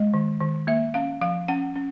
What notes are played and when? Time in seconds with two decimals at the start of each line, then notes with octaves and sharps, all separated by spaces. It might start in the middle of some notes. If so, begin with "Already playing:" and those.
Already playing: G#3 D#5
0.14 D#3
0.40 D#3
0.67 A#3 E5
0.94 C#4 F5
1.21 F3 F5
1.48 C#4 F#5
1.76 C#4